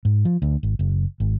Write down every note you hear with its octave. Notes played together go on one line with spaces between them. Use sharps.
G#2
F3
D2
G#1
F#1
G#1